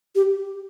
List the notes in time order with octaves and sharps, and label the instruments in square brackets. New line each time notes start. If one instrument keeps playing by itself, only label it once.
[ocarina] G4